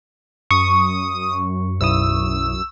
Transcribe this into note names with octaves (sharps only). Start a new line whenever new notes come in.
F#2 C#6 D#6
B1 E4 D#6 E6